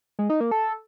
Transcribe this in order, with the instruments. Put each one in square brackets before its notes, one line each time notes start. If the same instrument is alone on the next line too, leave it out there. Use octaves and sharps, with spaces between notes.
[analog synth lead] G#3
D#4
A#3
A4